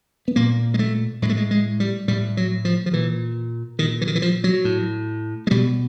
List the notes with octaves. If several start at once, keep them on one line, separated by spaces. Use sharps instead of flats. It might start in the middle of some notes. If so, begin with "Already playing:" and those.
B3
A#2 A#3
G#3
A3
A2 G#3
A3
G#3
G#3
G3
A2 G3
F#3
F3
F3
A#2 E3
A#2 D#3
E3
D#3
E3
F3
F#3
A2
G#3
B2 G3